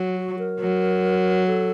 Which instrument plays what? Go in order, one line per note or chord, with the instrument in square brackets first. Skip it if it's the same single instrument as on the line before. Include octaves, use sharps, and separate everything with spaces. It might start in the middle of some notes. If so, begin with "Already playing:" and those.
Already playing: [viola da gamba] F#3
[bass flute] F#4
A#4
[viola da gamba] F#3
[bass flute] A4